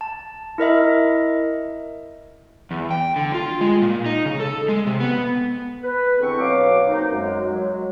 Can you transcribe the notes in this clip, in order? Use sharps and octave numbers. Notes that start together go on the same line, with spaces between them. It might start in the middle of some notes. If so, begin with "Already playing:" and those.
A5
E4 A#4 D#5 E5
E2
G5
D3
F4
G#3
A#2
D#4
C#3
A4
G#3
C3
B3
B4
E2 D3 C4 C#6
B2 F#3 F5 D6
A#3 C4 D#4
F#2 G#3
F#3 G#3